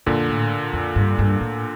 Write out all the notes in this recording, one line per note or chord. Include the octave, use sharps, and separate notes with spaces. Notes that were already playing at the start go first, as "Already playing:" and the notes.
F2 A#2 D3
A2
F2
G2
G2
A2